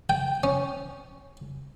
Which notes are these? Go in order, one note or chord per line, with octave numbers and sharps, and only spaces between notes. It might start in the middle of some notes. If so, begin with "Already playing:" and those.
G5
C#4